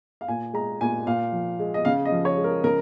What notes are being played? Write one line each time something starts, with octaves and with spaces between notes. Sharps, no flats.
F5
A#2 G#5
G#3 A#5
A#2 G#5
A#2 F5
F3
G#3
D#5
C#3 F5
D#5
F3
C#5
G#3
A#4
C#3 A#4